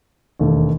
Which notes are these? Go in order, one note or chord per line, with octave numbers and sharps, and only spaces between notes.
E1 D#2 D#3 A3